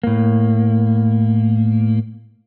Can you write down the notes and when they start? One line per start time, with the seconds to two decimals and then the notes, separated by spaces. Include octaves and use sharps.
0.04 A2 A#3